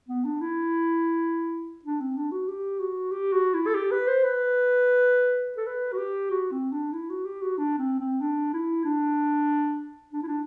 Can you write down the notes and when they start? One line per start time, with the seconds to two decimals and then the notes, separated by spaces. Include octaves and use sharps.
0.08 B3
0.25 D4
0.41 E4
1.84 D4
2.01 C4
2.17 D4
2.32 F#4
2.48 G4
2.80 F#4
3.12 G4
3.33 F#4
3.54 E4
3.67 A4
3.75 G4
3.91 B4
4.07 C5
4.24 B4
5.58 A4
5.67 B4
5.92 F#4
5.98 G4
6.31 F#4
6.52 C4
6.72 D4
6.93 E4
7.10 F#4
7.25 G4
7.42 F#4
7.58 D4
7.78 C4
8.00 C4
8.21 D4
8.54 E4
8.85 D4
10.13 D4
10.23 E4
10.28 D4